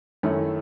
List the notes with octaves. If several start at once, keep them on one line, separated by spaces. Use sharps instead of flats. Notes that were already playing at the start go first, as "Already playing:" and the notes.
F#2 D#3 A3 C#4 E4